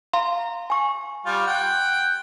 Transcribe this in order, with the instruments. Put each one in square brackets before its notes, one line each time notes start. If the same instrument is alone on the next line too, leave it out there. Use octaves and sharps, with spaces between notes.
[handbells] F5 A#5 C6
G#5 C#6
[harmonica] G3 F4
F#5 G5